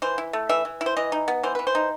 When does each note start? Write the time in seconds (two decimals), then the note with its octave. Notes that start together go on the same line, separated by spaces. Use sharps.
0.02 E3 C5
0.18 E4
0.33 A3
0.49 E3 E5
0.65 E3
0.81 E4
0.86 C5
0.96 E3 D#5
1.12 D#4
1.28 B3
1.43 E3 C5
1.55 E3 B4
1.67 C5
1.75 D#4